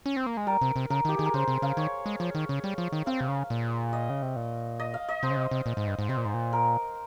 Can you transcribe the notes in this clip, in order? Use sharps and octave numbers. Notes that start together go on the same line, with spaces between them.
C#4
C4
A#3
G#3
G3 A#4
C3
C3
C#3 A#4
D#3 G4
D#3 G#4
A#4
C#3 C5
C3
C#3 F5
D#3 C#5
G#3
F3 C#5
D#3
C#3
G3
F3
D#3
C4 F5
C3
C#3
A#2
D#5
C#3
C3
A#2
D#5
F5
D#5
C3 C5
C#3
C3
C3
A#2
G#2
G2
G#2
C3 C5
A#2
G#2
A#2
A#4